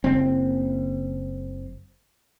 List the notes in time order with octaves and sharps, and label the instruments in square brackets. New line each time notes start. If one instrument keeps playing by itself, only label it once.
[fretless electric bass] F#1 C4